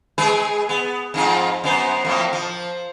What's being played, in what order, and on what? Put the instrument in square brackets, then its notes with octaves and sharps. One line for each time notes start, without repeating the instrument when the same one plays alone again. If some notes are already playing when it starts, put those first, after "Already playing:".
[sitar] G#3 G#4 B4
B3
F2 G#2 F4
F#2 B3 C5
F2 A2 A#3
F3